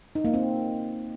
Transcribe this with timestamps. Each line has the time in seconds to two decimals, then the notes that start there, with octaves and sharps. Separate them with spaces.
0.15 D#4
0.25 A#3
0.34 C4